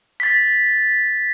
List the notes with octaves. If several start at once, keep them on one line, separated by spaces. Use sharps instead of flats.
A6 B6